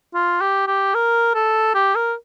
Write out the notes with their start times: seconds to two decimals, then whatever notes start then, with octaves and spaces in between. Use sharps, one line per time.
0.14 F4
0.41 G4
0.67 G4
0.95 A#4
1.35 A4
1.74 G4
1.95 A#4